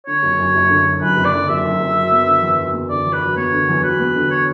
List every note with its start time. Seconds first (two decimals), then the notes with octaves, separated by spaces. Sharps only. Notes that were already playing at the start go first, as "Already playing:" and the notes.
0.07 D3 C#5
0.23 F#1
0.39 F#2
0.54 F#1
0.70 D3
0.86 F#1
1.01 F#2 B4
1.17 F#1
1.25 D5
1.33 D3
1.49 F#1 E5
1.64 F#2
1.80 F#1
1.95 F#3
2.12 B3
2.26 D3
2.42 E2
2.58 F#3
2.73 B3
2.89 D3 D5
3.06 E2
3.13 B4
3.20 F#3
3.36 B3 C#5
3.52 D3
3.69 E2
3.84 F#3 B4
3.99 B3
4.16 D3
4.31 C#5